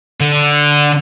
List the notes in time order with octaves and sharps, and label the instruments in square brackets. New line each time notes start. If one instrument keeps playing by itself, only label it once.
[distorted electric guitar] D3